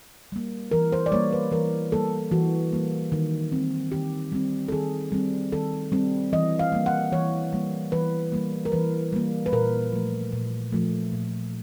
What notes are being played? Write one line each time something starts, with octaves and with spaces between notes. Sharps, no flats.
G3 A#3
E3 A#4
C5
D5
G3 A#3 C#5
B4
E3 A#4
G3 A#3 A4
E3 F#4
G3 A#3
D#3
G3 C4
D#3 G4
G3 C4
A4
D#3 G#4
G3 C4
D#3 A4
G3 C4
E3 D#5
F5
G3 A#3
F#5
E3 C#5
G3 A#3
E3 B4
G3 A#3
A#4
E3 B4
G3 A#3
B4
A#2 A#4
F3 A3
A#2
F3 A3
A#2